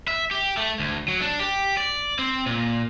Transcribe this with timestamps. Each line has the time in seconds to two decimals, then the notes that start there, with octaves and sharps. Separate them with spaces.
0.08 E5
0.31 G4
0.57 A3
0.79 D2
1.08 F#3
1.22 D4
1.40 G4
1.77 D5
2.19 C4
2.46 A#2